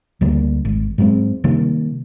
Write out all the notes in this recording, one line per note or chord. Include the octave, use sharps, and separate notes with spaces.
D2 D3 G3 A#3
G#1
G#2 F#3 G#3 C4
C3 D#3 G3 A#3